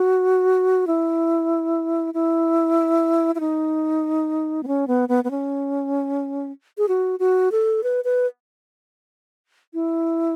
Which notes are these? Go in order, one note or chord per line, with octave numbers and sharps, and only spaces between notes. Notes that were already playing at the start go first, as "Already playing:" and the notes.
Already playing: F#4
E4
E4
E4
D#4
B3
C#4
B3
B3
B3
C#4
G#4
F#4
F#4
A4
B4
B4
E4